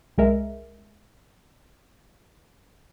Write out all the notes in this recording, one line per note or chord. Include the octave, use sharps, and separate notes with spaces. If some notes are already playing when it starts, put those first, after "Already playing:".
C2 G#3 A#4 E5